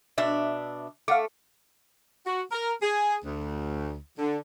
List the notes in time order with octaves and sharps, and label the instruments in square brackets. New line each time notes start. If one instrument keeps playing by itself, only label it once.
[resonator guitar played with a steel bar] B2 D4 E5
[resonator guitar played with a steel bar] A3 [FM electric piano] F5 F#5 D6
[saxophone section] F#4
A#4
G#4
D2
D3